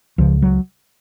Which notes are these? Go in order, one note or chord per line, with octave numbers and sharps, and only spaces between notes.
C#2 C#3 F3
F#3